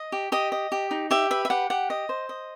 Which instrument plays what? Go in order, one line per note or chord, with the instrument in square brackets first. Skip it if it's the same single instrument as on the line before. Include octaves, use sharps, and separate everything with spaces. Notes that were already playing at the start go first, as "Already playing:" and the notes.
Already playing: [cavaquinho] D#5
G4
G4 D#5
D#5
G4
D#4
G4 E5
B4 E5
E5
G4 F#5
G4 F#5
D#5
C5
D#5